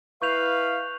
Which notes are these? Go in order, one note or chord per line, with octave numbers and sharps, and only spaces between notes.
E4 B4 F5 C#6 G6 F7